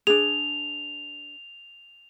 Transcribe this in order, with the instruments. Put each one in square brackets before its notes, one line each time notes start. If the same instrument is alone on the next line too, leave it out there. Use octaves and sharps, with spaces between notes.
[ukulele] D4 G#4 [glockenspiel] F7